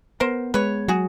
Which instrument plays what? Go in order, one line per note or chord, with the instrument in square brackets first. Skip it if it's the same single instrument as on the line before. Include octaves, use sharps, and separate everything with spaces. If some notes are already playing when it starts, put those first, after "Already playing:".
[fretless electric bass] B3 [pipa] A#4 C5
[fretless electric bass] G#3 [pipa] B4 C#5
[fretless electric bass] F#3 [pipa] F#4 G#4